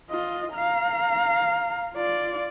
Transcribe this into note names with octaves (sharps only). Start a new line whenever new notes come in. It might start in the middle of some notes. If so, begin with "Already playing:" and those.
F4 D#5
F5 A#5
F4 D5